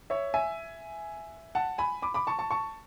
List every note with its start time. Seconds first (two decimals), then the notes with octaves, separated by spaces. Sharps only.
0.10 C#5 E5
0.34 E5 G#5
1.55 F#5 A5
1.78 G#5 B5
2.02 B5 D6
2.14 B5 D6
2.27 A5 C#6
2.39 A5 C#6
2.51 A5 C#6